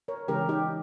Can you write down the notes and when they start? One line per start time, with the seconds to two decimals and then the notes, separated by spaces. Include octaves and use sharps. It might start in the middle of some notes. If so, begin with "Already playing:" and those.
0.08 A#4 C#5
0.28 C#3 E3 G#3 C#4 G4 A#4
0.49 D#4 G4